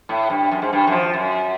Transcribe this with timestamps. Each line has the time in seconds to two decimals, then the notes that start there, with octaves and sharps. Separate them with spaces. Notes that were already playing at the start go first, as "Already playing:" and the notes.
0.09 A2
0.30 G2
0.51 F#2
0.62 G#2
0.73 G2
0.87 F#2
0.92 F3
1.14 F#2